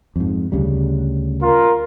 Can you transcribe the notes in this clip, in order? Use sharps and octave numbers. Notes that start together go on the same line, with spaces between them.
F2 G#2
D2 C#3 G3
F4 A#4